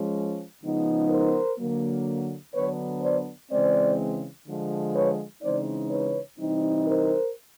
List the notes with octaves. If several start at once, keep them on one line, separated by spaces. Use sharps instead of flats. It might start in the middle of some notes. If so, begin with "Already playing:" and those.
Already playing: F3 G#3 C#4
C#3 F3 G#3 B3 D#4
A#4 C5
D3 F#3 A#3
D3 F#3 B3 D4 B4 C#5
C5 D5
C#3 E3 G#3 C4 C5 D5
D3 F3 G#3
B4 C#5
C#3 E3 G#3 C4 D#4 C5 D5
B4 C#5
C3 E3 G3 C4 D#4
A#4 C5